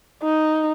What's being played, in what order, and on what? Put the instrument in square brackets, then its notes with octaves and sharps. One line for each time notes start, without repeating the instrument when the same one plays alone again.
[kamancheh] D#4